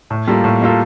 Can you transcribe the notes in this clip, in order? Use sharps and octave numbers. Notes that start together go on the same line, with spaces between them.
A2
G3 A#3 F4 A4
A2
G3 A#3 F4 A4